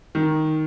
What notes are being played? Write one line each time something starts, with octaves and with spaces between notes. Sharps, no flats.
D#3